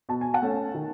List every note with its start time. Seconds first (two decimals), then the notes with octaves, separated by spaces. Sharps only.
0.09 B2 A5
0.21 G#5
0.34 F#5 A5
0.42 A3 C#4
0.74 D#3